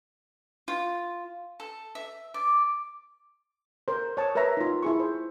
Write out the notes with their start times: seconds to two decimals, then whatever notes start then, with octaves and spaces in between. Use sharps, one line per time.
0.68 F4
1.60 A4
1.95 E5
2.34 D5
3.88 A#4 C5
4.17 C#5 A5 C#6 D#6
4.35 A#4 B4 C#5 E5 A#5
4.57 D#4 F4
4.82 E4 G#4 C#6
5.00 C5